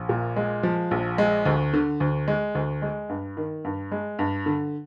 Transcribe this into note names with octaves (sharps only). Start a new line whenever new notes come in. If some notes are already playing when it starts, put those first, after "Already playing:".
Already playing: A#1
A#2
G#3
F3
A#1
G#3
D2
D3
D2
G#3
D2
G#3
G2
D#3
G2
G#3
G2
D3